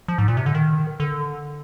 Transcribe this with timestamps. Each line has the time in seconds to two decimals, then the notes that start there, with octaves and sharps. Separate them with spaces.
0.08 F3
0.18 G#2
0.28 A#2
0.37 C3
0.46 D3
0.55 D#3
1.00 D3